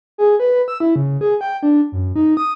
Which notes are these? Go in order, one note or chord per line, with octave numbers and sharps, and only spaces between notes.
G#4
B4
E6
E4
C#3
G#4
G5
D4
F#2
D#4
D#6